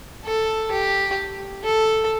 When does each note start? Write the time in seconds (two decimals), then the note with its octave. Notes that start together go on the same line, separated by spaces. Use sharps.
0.25 A4
0.71 G4
1.64 A4